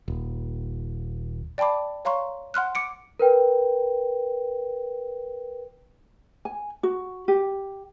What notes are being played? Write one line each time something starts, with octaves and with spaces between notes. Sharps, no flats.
D#1
D5 G5 A5 B5 D6
C#5 F5 A#5 C6 C#6
F#5 C6 F6 F#6
D6 C#7 D7
A#4 B4 G5
G#5
F#4
G4